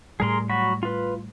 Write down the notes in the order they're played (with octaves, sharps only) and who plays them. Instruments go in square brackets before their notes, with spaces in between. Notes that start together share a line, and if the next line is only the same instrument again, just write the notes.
[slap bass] A2 G3 [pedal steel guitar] G#4 A#4 C6
[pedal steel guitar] F#3 F#4 B5
F4 B4